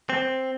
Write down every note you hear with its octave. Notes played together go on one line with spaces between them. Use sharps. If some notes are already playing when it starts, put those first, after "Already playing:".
C4